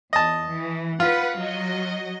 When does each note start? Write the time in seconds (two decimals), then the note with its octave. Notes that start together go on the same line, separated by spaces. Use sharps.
0.13 E2 D#5 A5
0.50 E3
1.00 F4 B4 F#5
1.37 F#3 F#4 D#5